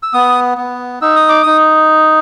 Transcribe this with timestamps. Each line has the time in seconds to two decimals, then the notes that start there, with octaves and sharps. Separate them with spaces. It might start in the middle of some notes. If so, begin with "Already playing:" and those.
0.03 E6
0.13 B3 D#6
0.58 B3
1.02 D#4 E6
1.16 D#6
1.29 D6
1.43 D#4 D#6